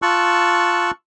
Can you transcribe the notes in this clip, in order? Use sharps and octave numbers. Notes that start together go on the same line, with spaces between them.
F4 A5 C#6 E6 F#6